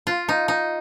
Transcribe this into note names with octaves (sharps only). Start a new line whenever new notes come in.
F4
D#4
D#4